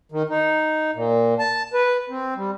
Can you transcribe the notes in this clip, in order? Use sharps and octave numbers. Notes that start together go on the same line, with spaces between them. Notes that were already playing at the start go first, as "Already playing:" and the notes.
D#3
D#4
A#2
A5
B4
C4
G3